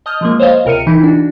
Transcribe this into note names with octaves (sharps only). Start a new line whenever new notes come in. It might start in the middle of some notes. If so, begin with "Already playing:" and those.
D#5 A5 D#6 F6 G6
F3 G#3 A#3
C5 C#5 D#5 F5
C#2 C3 A#4 F6 C#7 D#7
E3 D#4 E4
D4 F#4